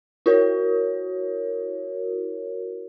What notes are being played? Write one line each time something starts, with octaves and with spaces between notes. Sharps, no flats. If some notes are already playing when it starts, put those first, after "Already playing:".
E4 F#4 A#4 C#5